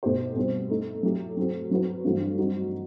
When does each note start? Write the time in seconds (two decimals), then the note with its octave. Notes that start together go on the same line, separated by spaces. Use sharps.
0.03 B2 A3 D#4 G4 C5
0.36 B2 G3 C4
0.70 A3 D#4 A4
1.03 F#3 A3 E4 G4
1.37 F#3 C4 F#4 A4
1.71 F#3 C4 F#4 B4
2.04 G2 E3 A3 C4 F#4
2.38 G3 C4 D#4 F#4